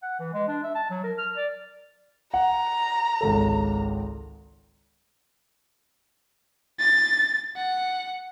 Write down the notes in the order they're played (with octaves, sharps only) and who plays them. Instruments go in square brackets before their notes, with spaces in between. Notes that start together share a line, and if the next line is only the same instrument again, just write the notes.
[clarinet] F#5
E3
G#3
D4
E5
A5
F#3
A#4
F6
D5
[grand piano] F#5 [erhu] A#5
[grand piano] G#1 C#2 A4
[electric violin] A6
F#5